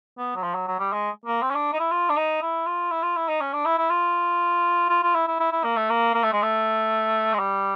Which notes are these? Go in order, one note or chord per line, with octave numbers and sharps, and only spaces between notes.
B3
F#3
F3
F#3
F#3
G3
G#3
A#3
C4
C#4
D4
D#4
E4
F4
D4
D#4
E4
F4
E4
F4
E4
D#4
C#4
D4
E4
E4
F4
F4
F4
E4
E4
E4
E4
A#3
A3
A#3
A#3
A3
G#3
A3
G#3
G3